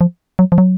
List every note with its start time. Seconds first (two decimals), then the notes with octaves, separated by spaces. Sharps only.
0.01 F3
0.39 F#3
0.52 F3
0.58 F#3